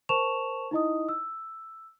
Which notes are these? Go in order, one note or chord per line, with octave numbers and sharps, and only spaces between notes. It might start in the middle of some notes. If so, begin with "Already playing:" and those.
A#4 C5 A5 C#6 E7 F7
D#4 E4 D#5 D#6
E6